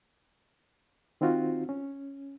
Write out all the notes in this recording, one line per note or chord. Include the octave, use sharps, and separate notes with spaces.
D#3 C4 D#4 F4 F#4
C#4